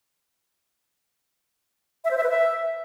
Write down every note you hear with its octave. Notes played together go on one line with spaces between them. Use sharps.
E5
C5
E5
B4
E5